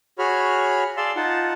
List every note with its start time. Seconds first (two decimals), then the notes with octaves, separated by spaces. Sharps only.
0.19 F#4 G#4 C#5 B5 F6
0.97 G#4 D5 F5 A5 C6 E6
1.16 D#4 F4 F#5 A5